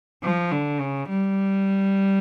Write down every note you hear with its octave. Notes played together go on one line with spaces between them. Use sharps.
F3
D3
C#3
G3